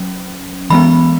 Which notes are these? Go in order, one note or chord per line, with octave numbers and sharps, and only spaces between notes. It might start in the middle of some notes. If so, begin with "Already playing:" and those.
Already playing: F#3 C#4
E3 G#3 B3 B5